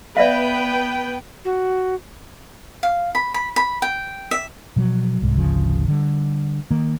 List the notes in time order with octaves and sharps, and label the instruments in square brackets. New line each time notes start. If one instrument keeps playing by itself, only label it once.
[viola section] B3 B4 G5 [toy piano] D5 E5 F5
[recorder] F#4
[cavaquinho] F5
B5
B5
B5
G5
E5
[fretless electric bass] B2 F3 F#3
C2 G#2
G#1 D2 C#3 F3
D3 G3
D#3 A#3